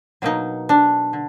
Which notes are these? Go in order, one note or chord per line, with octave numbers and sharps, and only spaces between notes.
B2 F#3 A#3 D#4
D4
D3